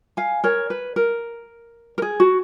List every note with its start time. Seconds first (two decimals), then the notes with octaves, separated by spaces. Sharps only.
0.17 F5 G#5
0.44 A#4 C#5
0.70 B4
0.96 A#4
1.98 A#4
2.02 G#4
2.20 F#4